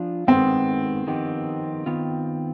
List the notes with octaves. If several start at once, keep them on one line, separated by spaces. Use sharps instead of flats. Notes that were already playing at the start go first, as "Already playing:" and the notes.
Already playing: F3 D4 F4
G#2 D#3 G#3 B3 C4
F2 D#3 B3 D#4 G4
D#3 B3 F4